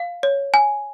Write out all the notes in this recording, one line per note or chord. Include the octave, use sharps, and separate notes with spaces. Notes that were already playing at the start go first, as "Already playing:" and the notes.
Already playing: F5
C#5
G#5